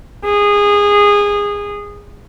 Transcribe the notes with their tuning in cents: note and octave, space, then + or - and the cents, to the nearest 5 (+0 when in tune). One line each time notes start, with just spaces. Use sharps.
G#4 -20